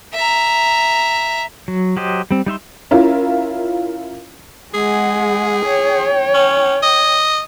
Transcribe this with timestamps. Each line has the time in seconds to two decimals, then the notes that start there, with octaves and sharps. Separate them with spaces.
0.14 E5 A#5
1.68 F#3
1.97 F#3 G4 C5 D#5
2.31 G3 C4
2.46 G3 D#4 E5 C6
2.91 C#4 E4 F4 A#4
4.74 G#3 G#4 F#5
5.66 C#5 G5
6.34 C#4
6.82 D#5